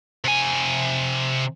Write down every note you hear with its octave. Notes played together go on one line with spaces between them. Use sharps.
C3 G#5